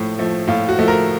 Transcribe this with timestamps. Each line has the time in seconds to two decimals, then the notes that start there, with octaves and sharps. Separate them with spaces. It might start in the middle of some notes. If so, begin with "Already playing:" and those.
Already playing: A2 F3 A3
0.18 F3 A3
0.48 A2 F4
0.69 F#4
0.78 F3 A3
0.88 A#4